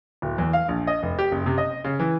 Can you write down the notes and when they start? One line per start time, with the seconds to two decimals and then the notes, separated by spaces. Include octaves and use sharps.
0.22 D1
0.38 E2
0.53 F5
0.68 A#1
0.87 D#5
1.03 F1
1.19 G4
1.32 F#1
1.46 C3
1.58 D#5
1.84 C#3
2.00 E3